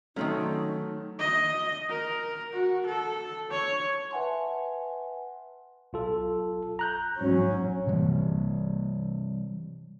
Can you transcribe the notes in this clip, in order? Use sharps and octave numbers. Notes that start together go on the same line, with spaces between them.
D#3 F#3 A3 C4 C#4 D#4 F6
D#5
A#4
F#4
A4
C#5
B4 E5 F#5 G#5 A5 C6
B1 F4 A4
A#5 F#6 G6
G#2 F#3 C#4
C3 E3 G3 C4